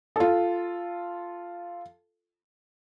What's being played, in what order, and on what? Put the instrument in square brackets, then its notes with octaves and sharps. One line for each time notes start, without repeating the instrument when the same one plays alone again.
[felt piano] F4 A4